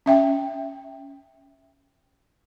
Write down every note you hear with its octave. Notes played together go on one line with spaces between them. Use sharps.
C#4 E5 G5